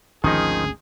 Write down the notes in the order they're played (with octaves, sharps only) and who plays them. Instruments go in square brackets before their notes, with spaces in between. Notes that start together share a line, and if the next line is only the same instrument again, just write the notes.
[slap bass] G#1 D2 C#4 [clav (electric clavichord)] D#3 F3 D#4 [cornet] G#4